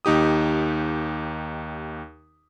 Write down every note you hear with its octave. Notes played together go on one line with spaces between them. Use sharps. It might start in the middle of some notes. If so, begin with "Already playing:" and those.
D#2 D#4 G4 D#6